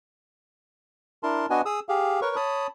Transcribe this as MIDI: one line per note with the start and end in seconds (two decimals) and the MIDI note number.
1.23 1.46 62
1.23 1.46 64
1.23 1.46 70
1.23 1.46 81
1.23 1.46 84
1.50 1.62 59
1.50 1.62 62
1.50 1.62 66
1.50 1.62 71
1.50 1.62 75
1.50 1.62 80
1.65 1.80 68
1.65 1.80 87
1.65 1.80 88
1.89 2.20 67
1.89 2.20 68
1.89 2.20 77
2.22 2.36 70
2.22 2.36 71
2.22 2.36 73
2.22 2.36 85
2.36 2.67 73
2.36 2.67 81
2.36 2.67 83
2.36 2.67 87